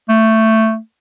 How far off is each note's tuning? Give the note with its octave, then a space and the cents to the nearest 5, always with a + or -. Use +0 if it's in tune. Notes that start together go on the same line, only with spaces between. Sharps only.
A3 +10